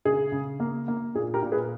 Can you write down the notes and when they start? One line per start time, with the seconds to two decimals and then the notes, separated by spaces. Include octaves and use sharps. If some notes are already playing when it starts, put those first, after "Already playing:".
0.05 C#3 G#4
0.32 C#3
0.60 A#3
0.88 A#3
1.15 A#2 G#4
1.34 G4 A#4
1.42 A#2
1.52 G#4 B4